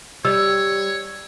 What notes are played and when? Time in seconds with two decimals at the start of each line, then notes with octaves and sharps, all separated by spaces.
0.25 G3 C#5 E6